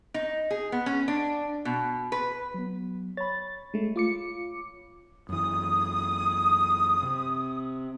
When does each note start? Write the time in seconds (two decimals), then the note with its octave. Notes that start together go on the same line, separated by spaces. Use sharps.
0.14 D#4
0.51 G#4
0.72 B3
0.86 C#4
1.08 D4
1.65 B2
2.12 B4
2.54 F#3 B3
3.17 C#5 B5 A6
3.74 G#3 A3
3.96 F4 D6 C#7
5.29 F#2 E3 D#6
7.02 C3